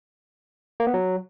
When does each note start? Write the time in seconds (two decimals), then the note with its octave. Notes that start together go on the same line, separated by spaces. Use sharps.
0.80 A#3
0.87 B3
0.94 F#3